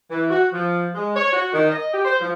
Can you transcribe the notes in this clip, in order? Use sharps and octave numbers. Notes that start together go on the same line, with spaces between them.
E3
F#4
F3
G#3
C#5
F#4
D#3
D#5
G4
C5
F3